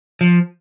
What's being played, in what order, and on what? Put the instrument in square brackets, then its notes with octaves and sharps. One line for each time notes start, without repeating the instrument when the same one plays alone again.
[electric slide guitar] F3